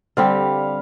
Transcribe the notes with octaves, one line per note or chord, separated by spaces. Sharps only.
D3 G3 C4 G4 F5